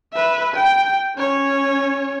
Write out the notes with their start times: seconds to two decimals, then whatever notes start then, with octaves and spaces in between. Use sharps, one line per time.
0.14 B4 E5
0.54 G5
1.16 C#4 C#5